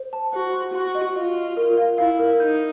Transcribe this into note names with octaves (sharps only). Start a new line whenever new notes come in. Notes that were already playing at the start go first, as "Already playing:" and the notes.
Already playing: C5
A5
F#4 C5
C6
F#4 C6
D#5
F4 D#5
D#5
A#4
F5
E4 F5
A#4
D#4 G6